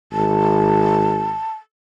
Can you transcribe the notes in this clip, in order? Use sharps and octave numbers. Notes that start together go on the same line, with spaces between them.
G#1 A5